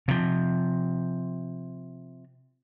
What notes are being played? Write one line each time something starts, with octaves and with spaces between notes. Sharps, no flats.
C3 F3